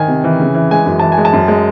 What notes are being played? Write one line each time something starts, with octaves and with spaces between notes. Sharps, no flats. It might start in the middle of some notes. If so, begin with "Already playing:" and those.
Already playing: D#3 G#5
C3
E3
C#3
E3
G#3 G#5
F#2
E3 A5
G#5
G#3
A5
F#2
G#3